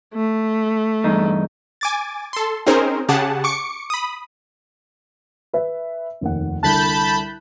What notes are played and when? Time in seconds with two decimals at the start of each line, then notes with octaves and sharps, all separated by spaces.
0.14 A3
1.04 E2 G2 D#4
1.81 G#5 D6 A6
2.33 A4 C6
2.66 C4 C#4 D#4 G#4 A#4 C5
3.09 C#3 G4 G#4 F#5 A5
3.44 C#6 D6 C#7
3.90 B5 D#6
5.53 B4 E5
6.21 F1 D#2 F#5
6.63 C2 D3 A5 B5 F#6 G6